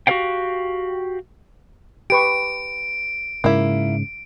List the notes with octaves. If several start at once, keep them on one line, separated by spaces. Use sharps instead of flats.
F#4 G4 A#4 C#5 F5 G5
G4 B4 C#6 D7
G#2 C#3 A#3 E4